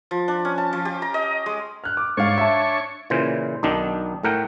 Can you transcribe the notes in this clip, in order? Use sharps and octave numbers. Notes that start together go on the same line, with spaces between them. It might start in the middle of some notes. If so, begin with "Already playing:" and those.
F3
D4
C#4
A5
F3
G4
A#5
D#5
G#3
F6 F#6
D6
G#2 D4 C#5 F5 C#6
E5 A5
A#2 C#3 E3 C5
B1 D#3 D4 D#4
A2 A3 A#4 F#5 G5